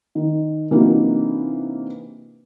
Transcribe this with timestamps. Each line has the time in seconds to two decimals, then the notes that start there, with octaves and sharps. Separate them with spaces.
0.15 D#3
0.71 C3 E3 F#3 A#3 D4 D#4